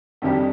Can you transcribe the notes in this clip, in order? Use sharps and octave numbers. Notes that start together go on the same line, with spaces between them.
F2 D#3 G3 D4 G4